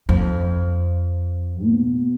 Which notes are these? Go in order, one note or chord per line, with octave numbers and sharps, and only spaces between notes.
F2
B2